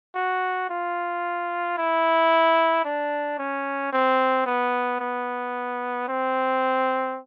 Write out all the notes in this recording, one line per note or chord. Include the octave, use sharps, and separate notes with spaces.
F#4
F4
E4
D4
C#4
C4
B3
B3
C4